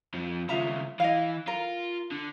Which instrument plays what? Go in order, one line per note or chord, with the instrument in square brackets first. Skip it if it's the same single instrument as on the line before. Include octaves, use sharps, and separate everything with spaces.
[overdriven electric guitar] F2 F3
[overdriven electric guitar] D#2 C#3 [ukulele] F4 E5 A#5
[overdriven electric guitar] E3 [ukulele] D#5 F5
[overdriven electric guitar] F4 [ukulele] A#4
[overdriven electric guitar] D3